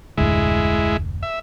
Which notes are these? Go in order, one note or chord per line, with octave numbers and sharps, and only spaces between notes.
F1 D2 A2 G#3 E4
E5